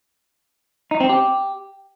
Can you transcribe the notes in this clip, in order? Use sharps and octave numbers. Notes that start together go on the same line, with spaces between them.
D#4
C4
G4